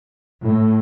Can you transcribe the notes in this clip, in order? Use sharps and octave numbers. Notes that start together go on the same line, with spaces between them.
A2